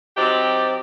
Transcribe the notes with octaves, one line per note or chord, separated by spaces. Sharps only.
F#3 C4 D#4 G4 C5 D5